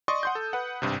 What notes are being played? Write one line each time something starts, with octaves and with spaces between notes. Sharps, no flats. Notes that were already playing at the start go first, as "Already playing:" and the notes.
D5 D#5 C6 C#6 D#6
F#5 C6 G6
A4
B4 F#5
G#1 G2 C3